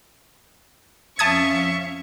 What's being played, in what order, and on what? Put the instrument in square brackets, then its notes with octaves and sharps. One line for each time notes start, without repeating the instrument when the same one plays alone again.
[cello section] F2 C#4 F5 [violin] E5 C#6 [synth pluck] A5 D#6 G#6